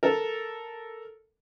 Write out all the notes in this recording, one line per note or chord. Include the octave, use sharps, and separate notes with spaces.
A4 A#4